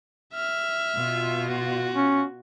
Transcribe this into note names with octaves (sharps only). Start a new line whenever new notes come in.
E5 F6
B2 F4
F#4
C#4